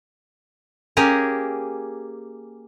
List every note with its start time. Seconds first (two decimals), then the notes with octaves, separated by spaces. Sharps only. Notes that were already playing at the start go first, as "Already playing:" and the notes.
0.97 A#3 C#4 G4 G#4 A#4